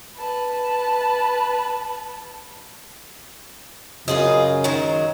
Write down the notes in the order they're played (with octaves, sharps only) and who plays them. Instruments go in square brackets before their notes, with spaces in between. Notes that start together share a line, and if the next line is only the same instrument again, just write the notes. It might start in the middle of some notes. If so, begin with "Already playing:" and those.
[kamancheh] B4 A5
[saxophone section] F#2 C#3 [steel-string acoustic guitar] F4 G#4 D#5
[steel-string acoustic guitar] D#3 F#3 G#3